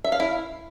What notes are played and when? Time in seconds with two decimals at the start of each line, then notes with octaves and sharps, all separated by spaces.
0.04 E5
0.12 F5
0.20 E4